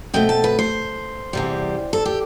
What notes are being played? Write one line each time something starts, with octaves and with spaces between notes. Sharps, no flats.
B2 A3 C4 G5
A5
B4
C5
E2 C3 G3
A4
G4